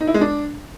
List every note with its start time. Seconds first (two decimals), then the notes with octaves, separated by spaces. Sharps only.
0.01 D#4
0.07 E4
0.14 G#3
0.21 D4